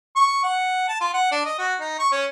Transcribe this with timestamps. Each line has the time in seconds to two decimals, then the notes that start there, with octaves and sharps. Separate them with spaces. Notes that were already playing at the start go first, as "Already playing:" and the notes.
0.16 C#6
0.44 F#5
0.88 A5
1.01 F4
1.13 F#5
1.32 D4
1.46 D#5
1.59 F#4
1.80 D#4
1.99 C#6
2.12 C#4